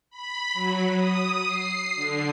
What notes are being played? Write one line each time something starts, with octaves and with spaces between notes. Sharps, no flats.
B5
F#3
D#6
C7
D3